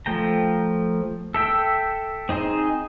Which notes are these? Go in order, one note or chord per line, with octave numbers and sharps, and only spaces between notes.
F3 A3 G5 A#5
A4 E5 G5
C4 D#4 G#4 C5